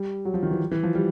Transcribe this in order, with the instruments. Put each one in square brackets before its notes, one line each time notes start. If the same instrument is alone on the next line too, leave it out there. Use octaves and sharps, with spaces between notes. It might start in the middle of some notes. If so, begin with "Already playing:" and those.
Already playing: [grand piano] G3
F#3
F3
D#3
E3
E3
F3
G3